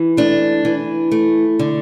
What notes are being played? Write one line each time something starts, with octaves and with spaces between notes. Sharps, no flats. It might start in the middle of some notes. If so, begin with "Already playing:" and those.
Already playing: E3
A3 D4
E3
A3
D3